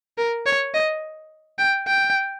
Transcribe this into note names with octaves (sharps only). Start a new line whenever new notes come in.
A#4
C#5
D#5
G5
G5